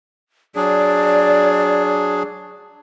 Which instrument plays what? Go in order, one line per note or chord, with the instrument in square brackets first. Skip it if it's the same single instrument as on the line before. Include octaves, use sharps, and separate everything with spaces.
[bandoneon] F#3 D4 G#4 [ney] D5